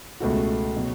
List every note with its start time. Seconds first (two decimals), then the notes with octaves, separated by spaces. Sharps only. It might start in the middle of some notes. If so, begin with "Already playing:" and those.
0.20 C#2 B2 A3 F#4
0.77 B2 F#3